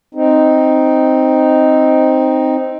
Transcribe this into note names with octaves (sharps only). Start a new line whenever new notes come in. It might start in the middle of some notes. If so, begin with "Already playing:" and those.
C4 D#4